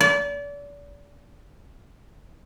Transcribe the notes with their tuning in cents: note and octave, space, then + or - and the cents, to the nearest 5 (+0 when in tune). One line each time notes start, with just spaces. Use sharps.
D5 -35